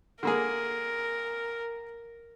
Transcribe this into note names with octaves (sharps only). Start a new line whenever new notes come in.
D3 A#3 G#4 A#4